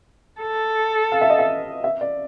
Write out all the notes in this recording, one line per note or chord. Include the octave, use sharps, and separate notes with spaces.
A4
F5
E5
D#5
E5
E5
D5